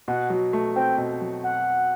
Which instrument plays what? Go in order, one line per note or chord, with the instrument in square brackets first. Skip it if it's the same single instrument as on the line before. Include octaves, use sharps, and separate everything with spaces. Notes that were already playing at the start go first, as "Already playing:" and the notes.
[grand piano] B2 [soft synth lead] F#5
[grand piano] F#3
A3
[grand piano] C4 [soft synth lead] G5
[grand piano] B2
F#3
[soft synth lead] F#5